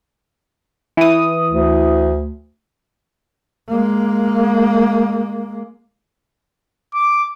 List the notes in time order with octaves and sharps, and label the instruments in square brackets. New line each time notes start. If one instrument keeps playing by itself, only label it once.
[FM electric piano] E3 D#6
[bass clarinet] D2
[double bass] G#3 A#3
[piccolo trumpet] D6